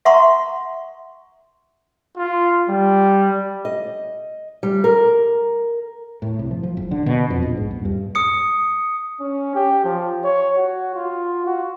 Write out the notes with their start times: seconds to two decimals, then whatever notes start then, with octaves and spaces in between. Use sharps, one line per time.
0.05 E5 F#5 A#5 C6 C#6 D#6
2.17 F4
2.68 G3
3.65 D#5
4.63 G3
4.84 A#4
6.22 A2
6.39 C2
6.51 F3
6.63 F3
6.77 F#1
6.91 D3
7.06 B2
7.30 F2
7.42 A#1
7.57 G#2
7.71 D#1
7.85 G2
8.15 D#6 C#7
9.21 C#4
9.55 G4
9.84 F3
10.24 C#5
10.57 F#4
10.95 F4
11.46 F#4